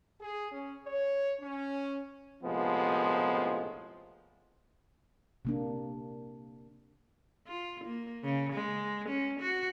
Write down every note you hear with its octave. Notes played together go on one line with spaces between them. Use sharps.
G#4
C#4
C#5
C#4
A#1 A2 C3 F3 G#3 B3
C3 A#3 D4
F4
A#3
C#3
G#3
C#4
F#4